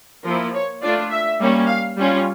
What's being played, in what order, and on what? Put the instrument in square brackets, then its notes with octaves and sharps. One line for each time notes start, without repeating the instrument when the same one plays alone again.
[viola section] F3 A#3 E4 A#4
C#5
A3 D4 F4 D5
E5
G3 A#3 C#4
F5
G3 C#4 F4